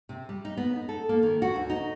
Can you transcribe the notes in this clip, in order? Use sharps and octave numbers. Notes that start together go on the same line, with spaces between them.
C3
G3
D#4
B3
D#4
A4
A#3
D#3
F#4
D2
D#4